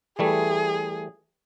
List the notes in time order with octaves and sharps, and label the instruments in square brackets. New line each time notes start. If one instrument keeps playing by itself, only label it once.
[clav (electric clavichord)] E3 G3 A3 [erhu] G#4